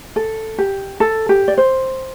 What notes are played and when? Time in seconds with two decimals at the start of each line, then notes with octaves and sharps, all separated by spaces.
0.16 A4
0.58 G4
1.00 A4
1.29 G4
1.48 D5
1.58 C5